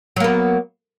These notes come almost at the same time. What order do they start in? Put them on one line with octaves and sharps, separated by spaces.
F#3 A#3 B3